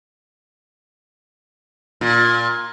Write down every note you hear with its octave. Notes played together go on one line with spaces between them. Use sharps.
A#2